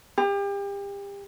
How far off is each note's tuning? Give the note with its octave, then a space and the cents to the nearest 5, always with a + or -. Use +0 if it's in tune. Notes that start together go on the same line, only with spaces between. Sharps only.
G4 +35